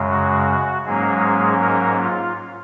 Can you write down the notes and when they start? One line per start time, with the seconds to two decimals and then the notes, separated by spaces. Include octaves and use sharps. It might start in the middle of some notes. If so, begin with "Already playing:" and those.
Already playing: F#2 C#3 G#3
0.09 F#4
0.85 G#2 F#3 G#3 A#3 C#4 G#4
1.61 A#3 A#4
1.99 F4